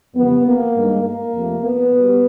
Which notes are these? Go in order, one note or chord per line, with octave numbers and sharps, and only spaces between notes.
F2 C#3 E3 G3 B3
A#3
G2 D#3 G#3
A#3
F2 C3 F3 A3
B3
B2 G3